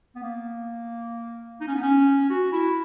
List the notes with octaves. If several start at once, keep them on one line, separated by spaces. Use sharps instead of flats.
B3
A#3
D#4
C#4
B3
C#4
F#4
E4